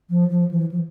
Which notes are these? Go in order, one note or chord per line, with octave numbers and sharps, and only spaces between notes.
F3
F3
E3
F3